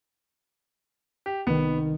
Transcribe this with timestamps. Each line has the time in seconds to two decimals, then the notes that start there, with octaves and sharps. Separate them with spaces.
1.26 G4
1.47 C2 D#3 B3